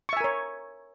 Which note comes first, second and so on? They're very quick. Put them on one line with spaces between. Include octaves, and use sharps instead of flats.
C#6 E5 G#5 A#4 C#5